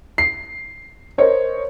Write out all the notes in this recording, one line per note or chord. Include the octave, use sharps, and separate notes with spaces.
C7
A#4 C5 C#5 D#5